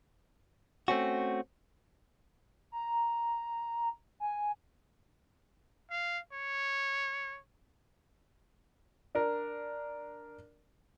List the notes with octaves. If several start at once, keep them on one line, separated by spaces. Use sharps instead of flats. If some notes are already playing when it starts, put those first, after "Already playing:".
A3 C4 C#4 F#4
A#5
G#5
F5
C#5
D4 A#4